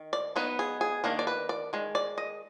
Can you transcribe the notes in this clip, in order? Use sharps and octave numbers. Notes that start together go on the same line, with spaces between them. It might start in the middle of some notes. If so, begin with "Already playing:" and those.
Already playing: D#3
D5
F#3 B3 D#4 B4
G#4
G#4
D#3 A#3 D4 A#4
D5
B4
D5
D#3 G#3
D5
D#5